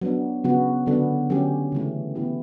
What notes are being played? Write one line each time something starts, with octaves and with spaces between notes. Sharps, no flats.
F#3 B3 D4
C#3 F#3 B3 F#4
D3 F#3 B3 D4 A4
D3 F#3 C#4 G4
C#3 E3 A3
E3 B3 E4 G4